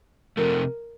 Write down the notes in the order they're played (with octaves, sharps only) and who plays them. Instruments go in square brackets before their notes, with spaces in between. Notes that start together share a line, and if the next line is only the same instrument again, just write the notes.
[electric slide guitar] C3 F3 A3 [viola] A#4